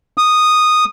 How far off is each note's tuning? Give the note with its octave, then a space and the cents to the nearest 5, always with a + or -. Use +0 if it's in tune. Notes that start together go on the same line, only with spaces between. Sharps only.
D#6 -10